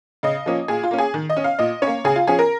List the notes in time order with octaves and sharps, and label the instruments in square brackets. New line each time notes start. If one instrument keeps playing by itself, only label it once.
[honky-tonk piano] C#3 D#5
F3 A#3 C#4
A#2 G#4
F4
A#3 C#4
G#4
D#3
D#5
C#4
F5
A#2 D#5
A#3 C#4 C#5
C#3 G#4
F4
F3 C#4 G#4
A#4